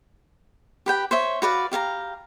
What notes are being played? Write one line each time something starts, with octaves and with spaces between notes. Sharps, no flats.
G4 B4 G5
C5 C#5 E5
F#4 B4 D5 F5
G4 F5 A5 A#5